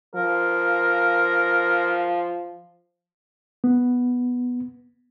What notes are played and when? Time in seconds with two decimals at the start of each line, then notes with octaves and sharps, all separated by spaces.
0.15 F3 A#4
3.64 B3